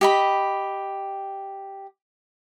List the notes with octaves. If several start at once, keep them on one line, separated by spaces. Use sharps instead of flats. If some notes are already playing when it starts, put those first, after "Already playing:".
G4 D#5 B5